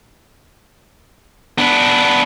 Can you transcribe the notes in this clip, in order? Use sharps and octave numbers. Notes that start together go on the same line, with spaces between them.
B3 D4